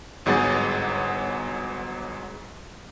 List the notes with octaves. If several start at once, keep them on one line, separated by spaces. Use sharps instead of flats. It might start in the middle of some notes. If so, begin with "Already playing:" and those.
G1 G#2 F#3 B3 G#4 A6